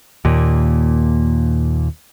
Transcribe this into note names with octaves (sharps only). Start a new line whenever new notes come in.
D#2 A#2